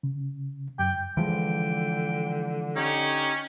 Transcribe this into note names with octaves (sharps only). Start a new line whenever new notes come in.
C#3
F#2 G5
D3 E3 F3 G#3 G5
C#4 D#4 G4 C#5